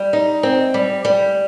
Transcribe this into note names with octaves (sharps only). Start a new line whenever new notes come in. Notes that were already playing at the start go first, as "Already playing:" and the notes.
Already playing: G3
D#4
C4
G3
G3